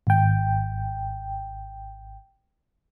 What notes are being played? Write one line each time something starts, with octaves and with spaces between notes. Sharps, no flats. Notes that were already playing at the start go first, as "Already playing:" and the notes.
G#1 G5